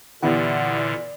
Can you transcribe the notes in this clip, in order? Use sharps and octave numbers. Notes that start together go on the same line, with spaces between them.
A#2 D3 E3 B3 E4 G4 D5 F#5